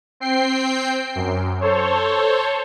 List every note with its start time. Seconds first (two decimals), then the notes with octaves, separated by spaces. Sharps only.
0.20 C4 G5 C7
1.15 F#2
1.61 A4 C5 C#5